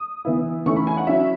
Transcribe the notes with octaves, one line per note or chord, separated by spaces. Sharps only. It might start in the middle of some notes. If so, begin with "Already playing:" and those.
Already playing: D#6
E3 B3 E4
E3 A3 C#4 E4 C#6
B5
G#5
F#5
F#3 C#4 E4 E5